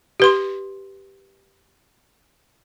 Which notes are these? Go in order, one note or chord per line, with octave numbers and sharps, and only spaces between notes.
G4 B4 C6